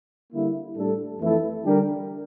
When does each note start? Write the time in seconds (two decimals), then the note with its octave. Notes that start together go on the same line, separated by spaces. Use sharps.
0.32 D3 G3 A#3 E4
0.77 A2 G3 D4 A4
1.21 F2 E3 A3 E4 A4
1.64 D3 G3 D4 G4 A#4